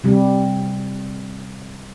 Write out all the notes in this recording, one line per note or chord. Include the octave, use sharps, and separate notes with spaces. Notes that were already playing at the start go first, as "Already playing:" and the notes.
C3 G3